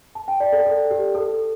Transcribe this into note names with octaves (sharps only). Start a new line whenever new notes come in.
A5
G5
D5
A4
A4
G4
A4